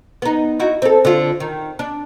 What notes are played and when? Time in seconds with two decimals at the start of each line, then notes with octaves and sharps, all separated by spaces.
0.22 B3 D#4
0.60 D#4 E4 F#4
0.82 C4 A4
1.05 D3 F4
1.40 D#3
1.79 D4